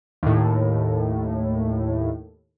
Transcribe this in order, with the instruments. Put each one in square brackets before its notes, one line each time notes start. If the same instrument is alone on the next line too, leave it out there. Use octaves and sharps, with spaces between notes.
[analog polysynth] D#2 A2